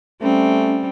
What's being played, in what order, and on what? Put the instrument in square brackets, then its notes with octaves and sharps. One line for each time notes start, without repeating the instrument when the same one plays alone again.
[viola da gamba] G3 C4 [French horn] A3 [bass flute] C#4